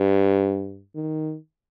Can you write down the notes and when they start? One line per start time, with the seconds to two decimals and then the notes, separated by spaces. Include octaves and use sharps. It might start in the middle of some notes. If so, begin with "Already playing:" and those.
Already playing: G2
0.95 D#3